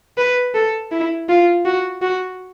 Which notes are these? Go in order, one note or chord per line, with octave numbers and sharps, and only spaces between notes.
B4
A4
E4
F4
F#4
F#4